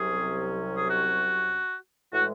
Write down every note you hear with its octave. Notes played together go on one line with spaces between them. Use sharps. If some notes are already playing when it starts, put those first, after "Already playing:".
Already playing: C2 C3 F#3 C#4 G#4
G#4
F#4
A2 E3 G#3 F#4